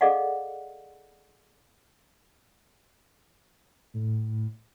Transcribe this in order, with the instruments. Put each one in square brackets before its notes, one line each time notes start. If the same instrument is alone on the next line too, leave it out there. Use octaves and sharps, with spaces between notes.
[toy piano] G#4 A4 D5 D#5 F5 F#5
[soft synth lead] A2